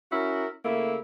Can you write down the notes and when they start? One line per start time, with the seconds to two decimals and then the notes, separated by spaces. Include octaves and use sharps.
0.11 C#4 E4 F#4 A#4
0.64 C#3 A3 A#3 E4